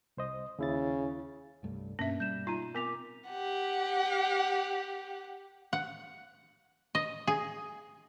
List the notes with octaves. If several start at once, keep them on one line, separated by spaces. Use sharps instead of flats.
C2 C5 D#5
D#2 C#3 E4 A6
C2 G2 A3
G2 B2 A#3 C#4 E5
G3 G6 E7
D#4 F4 E5 A#5 D#7
B3 C4 A#4 D6 B6 F7
G4 F#5
F#5
D#5
G#4